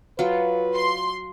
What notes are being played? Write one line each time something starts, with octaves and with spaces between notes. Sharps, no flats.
F#3 F4 B4
C6